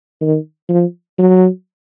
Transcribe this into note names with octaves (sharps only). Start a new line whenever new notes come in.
D#3
F3
F#3